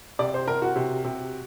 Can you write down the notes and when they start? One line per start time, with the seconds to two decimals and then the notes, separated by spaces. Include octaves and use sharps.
0.19 C3 D5
0.34 C5
0.47 C3 A#4
0.62 F#4
0.76 C3
1.04 C3